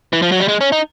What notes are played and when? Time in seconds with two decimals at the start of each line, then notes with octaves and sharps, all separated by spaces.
0.13 E3
0.22 F3
0.32 F#3
0.40 G3
0.48 G#3
0.61 C#4
0.72 D#4